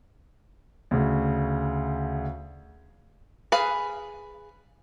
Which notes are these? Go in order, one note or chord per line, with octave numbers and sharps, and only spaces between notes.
D2 C#3
G#4 B4 F5